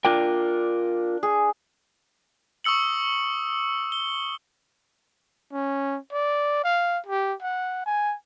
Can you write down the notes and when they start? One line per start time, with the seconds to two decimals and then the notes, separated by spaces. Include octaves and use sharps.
0.05 D4 F4 A#4 G5
1.23 G#4
2.64 C#6 D#6 E6 C#7 F#7
3.92 G7
5.53 C#4
6.12 D5
6.64 F5
7.06 G4
7.42 F#5
7.86 G#5